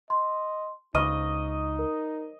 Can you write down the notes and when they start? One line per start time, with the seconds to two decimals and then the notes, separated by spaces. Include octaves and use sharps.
0.10 D#5 C6
0.95 C#2 D#4 D#5 C#6 F6 D#7
1.79 A#4